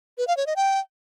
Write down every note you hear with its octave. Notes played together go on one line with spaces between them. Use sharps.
B4
F5
C#5
D#5
G5